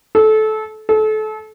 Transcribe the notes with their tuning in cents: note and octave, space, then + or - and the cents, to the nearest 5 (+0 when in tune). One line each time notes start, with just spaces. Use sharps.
A4 -20
A4 -30